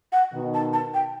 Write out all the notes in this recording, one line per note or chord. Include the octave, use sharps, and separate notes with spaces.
F#5
B2 D#3
A5
A5
G5